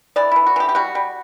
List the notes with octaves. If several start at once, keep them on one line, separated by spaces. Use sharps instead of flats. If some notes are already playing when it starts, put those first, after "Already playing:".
E3 D5
E3 E4
F#4
E3 G4
G4
G3 F#4
G3